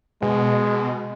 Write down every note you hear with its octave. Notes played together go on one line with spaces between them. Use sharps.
B2 G#3